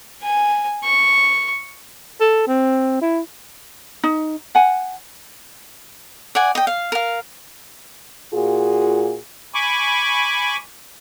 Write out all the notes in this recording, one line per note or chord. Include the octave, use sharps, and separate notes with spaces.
G#5
C#6
A4
C4
E4
D#4
F#5 G#5
D5 F#5 G#5
D#5 G5
F5
A#4 F5
A#2 F4 F#4 G#4
G#5 B5 C#6 D6